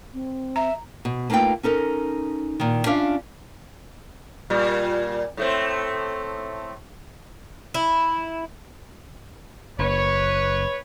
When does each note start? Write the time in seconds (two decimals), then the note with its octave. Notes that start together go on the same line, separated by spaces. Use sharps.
0.13 C4
0.56 E5 A#5
1.05 B2
1.30 A3 A#3 D#4 F4 B4 G5
1.63 C#4 D#4 A4 A#4
2.60 A#2 D#3
2.86 C#4 D4 F4 D5 E5 F5
4.50 A#2 G3
5.37 A2 A3 C4
7.74 E4
9.79 F#1 B4 C#5